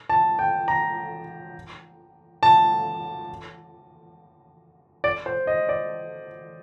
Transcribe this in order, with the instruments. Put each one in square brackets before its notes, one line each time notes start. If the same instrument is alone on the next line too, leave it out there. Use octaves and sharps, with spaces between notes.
[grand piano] A5
G5
A#5
A5
D5
C5
D#5
D5